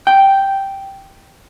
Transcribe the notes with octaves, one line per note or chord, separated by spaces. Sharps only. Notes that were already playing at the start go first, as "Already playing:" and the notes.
G5